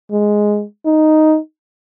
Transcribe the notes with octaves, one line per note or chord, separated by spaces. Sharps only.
G#3
D#4